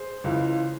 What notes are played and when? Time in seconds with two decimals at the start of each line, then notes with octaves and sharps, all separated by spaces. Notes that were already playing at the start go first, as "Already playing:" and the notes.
Already playing: G#4 C5
0.24 C#2 C#3 E3